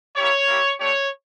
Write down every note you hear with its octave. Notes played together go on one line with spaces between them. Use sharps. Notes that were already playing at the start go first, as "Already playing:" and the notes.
A#3 E4 G4 C#5
A#3 E4 G4
A3 D4 G4 C#5